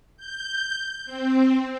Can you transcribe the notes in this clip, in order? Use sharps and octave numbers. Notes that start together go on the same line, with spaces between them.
G6
C4